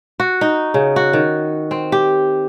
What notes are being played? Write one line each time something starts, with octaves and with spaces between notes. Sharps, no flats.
F#4
D#4
C#3
F#4
D#3
C4
G4